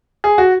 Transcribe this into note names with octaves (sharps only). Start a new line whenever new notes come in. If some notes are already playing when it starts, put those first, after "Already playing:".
G#4
F#4